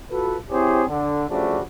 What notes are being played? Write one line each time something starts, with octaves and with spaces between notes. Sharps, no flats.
F4 F#4 A4 B4
C4 E4 G4 G#4 C5 C#5
D3
C#3 F3 G3 A3 D4 F#4